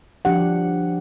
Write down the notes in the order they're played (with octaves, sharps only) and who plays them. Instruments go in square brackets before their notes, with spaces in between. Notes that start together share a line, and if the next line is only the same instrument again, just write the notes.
[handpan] F3 D4 G4 F#5